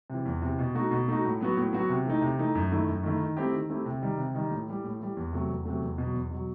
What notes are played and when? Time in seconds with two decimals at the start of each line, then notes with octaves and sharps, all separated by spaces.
0.10 C3 E3
0.26 E2
0.41 C3 E3
0.59 B2
0.75 A3 D#4 F#4
0.91 B2
1.08 A3 D#4 F#4
1.24 A2
1.41 F#3 B3 F#4
1.57 A2
1.73 F#3 B3 F#4
1.90 C3
2.05 E3 A3 D#4
2.22 C3
2.39 E3 A3 D#4
2.55 F#2
2.71 D#3 A3 E4
2.88 F#2
3.03 D#3 A3 E4
3.20 D#3
3.37 A3 C4 E4 G4
3.53 D#3
3.70 A3 C4 E4 G4
3.86 C3
4.02 D#3 G3 D#4
4.18 C3
4.35 D#3 G3 D#4
4.51 A2
4.68 E3 G3
4.84 A2
5.00 E3 G3
5.17 E2
5.33 C3 F#3 A3
5.49 E2
5.65 C3 F#3 A3
5.82 E2
5.98 B2 F#3
6.14 E2
6.31 B2 F#3